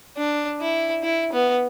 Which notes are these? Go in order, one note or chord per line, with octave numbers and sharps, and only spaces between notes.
D4
E4
E4
B3